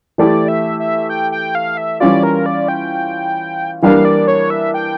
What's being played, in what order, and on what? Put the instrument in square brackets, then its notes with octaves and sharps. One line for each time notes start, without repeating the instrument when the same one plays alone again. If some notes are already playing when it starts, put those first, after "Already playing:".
[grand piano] E3 A3 E4 G4 [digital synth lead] D5
[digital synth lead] E5
E5
G5
G5
F5
E5
[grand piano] E3 G3 C#4 F4 [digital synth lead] D5
[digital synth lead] A#4
D5
G5
[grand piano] E3 G3 A#3 D4 [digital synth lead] F5
[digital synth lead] D5
C#5
E5
G5